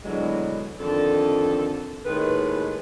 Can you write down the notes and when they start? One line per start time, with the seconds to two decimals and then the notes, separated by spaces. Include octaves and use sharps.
0.04 D2 B2 D3 E3 F#3 G#3
0.79 F2 D3 D#3 A4
2.05 D#2 A2 D#3 G#3 B4